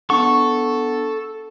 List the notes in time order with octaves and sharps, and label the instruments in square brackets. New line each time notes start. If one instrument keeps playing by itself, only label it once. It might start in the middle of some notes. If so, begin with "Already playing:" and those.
[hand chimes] B3 D4 F#5 [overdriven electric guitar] A4 [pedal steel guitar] C#6